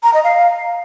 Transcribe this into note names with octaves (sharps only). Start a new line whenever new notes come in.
A#5
D#5
F5